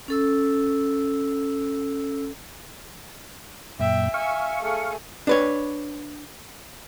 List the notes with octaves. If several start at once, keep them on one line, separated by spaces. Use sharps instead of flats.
C#4 A4 E6
F#2 A#2 E5 G5
E5 F5 G#5 C#6
A3 G#4
D4 B4 C#5